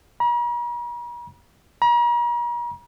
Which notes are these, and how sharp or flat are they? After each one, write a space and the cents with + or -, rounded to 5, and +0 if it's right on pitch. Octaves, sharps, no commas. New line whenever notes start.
A#5 +45
A#5 +40